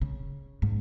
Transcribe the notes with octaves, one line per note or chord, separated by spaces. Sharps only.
C#3
G#2